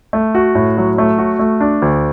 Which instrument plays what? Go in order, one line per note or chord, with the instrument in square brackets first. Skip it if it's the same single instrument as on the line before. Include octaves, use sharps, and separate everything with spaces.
[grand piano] A3
F#4
A2
F#3
A3
F#4
A3
D4
D2